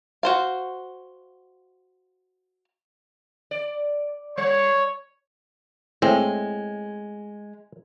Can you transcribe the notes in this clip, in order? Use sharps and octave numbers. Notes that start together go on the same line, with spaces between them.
F#4 C5 F5
D5
G3 C#5
A2 G#3 C4